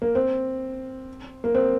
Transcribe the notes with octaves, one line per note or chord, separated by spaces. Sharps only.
A#3
C4
A#3
C4